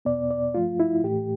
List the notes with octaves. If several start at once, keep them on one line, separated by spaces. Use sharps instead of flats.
E2 B2 B3 D5
D5
G2 F3 A3 F4
E4
A2 E3 A3 G4